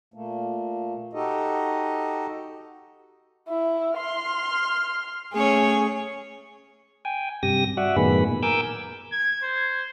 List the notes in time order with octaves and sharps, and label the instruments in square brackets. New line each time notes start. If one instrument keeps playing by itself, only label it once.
[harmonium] A#2 A3 A#3
D#4 F#4 G4 A4 D#5
[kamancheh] E4
C6 F6
[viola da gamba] A3 C#4 C#5 [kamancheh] G#4
[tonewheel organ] G5 G#5
G2 C3 G4 D#6 A#6
F#4 D5 E5 F#5
F#2 A2 D#3 B3 G#4 B5
A#2
A#4 G#5 D6 E6 G6
[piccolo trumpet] G#6
C5